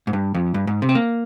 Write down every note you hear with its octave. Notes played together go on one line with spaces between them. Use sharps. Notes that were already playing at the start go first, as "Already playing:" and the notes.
G#2
G2
F2
G2
G#2
C3
C4
A#3